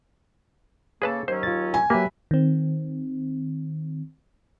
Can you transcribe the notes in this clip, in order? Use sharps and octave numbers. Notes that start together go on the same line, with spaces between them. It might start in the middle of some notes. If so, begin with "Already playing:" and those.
C#3 A#3 G#4 A4 B4 A5
D#2 F#3 C#4 C5
F4 A6
G#5
F#3 A#3 G4 B4 E5
D#3 C4